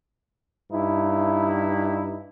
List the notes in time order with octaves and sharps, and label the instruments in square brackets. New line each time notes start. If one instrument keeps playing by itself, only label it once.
[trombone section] G2 D#4 E4